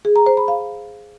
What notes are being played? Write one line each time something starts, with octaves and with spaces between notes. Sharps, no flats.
G#4
A#5
C5
B5
F5